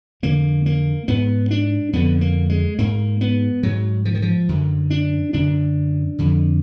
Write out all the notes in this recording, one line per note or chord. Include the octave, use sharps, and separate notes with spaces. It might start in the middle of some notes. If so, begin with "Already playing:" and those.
F2 D3 A#3
A#3
G#2 B3
D4
F2 D3 B3
A#3
G#3
G#2 A#3
B3
G#2 F#3
F3
D#3
F3
F#2 D3
D4
F#2 D3 D4
F2 D3